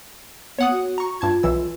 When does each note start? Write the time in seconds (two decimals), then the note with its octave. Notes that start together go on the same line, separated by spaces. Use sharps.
0.59 B3 C#5 F#5 D#6
0.72 F#4
0.98 A#5 C#6
1.21 G2 F4 A5 G#6
1.43 B1 E3 E6